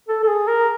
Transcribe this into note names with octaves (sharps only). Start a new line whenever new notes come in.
A4
A4
G#4
A#4